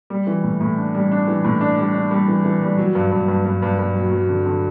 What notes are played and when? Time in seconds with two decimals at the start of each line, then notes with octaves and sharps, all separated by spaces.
0.10 G3
0.27 E3
0.43 A2
0.61 A2
0.78 D4
0.95 G3
1.11 D4
1.27 E3
1.44 A2
1.61 D4
1.78 G3
1.95 D4
2.11 G3
2.28 E3
2.44 E3
2.62 G3
2.77 F#3
2.95 G2
3.12 G2
3.28 G2
3.45 G2
3.62 G2
3.79 G2
3.95 F#3
4.11 F#3
4.29 D3
4.46 D3